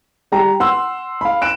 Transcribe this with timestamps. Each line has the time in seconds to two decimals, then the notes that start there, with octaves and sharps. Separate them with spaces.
0.32 G3 G4 A#5
0.60 F#5 C6 E6
1.21 F5 B5
1.42 F#6 D7 E7